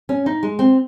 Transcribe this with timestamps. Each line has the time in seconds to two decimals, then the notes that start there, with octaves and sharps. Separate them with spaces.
0.09 C#4
0.26 D#4
0.43 G#3
0.59 C4